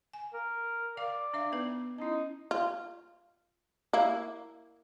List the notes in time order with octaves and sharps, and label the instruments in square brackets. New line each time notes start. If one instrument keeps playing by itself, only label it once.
[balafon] G#5
[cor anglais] A#4
[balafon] A#4 F5 [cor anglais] D5
[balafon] D4 E5 F5
B3 D#4 B4
[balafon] C#4 E4 [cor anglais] D#4
[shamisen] F4
A#3 E4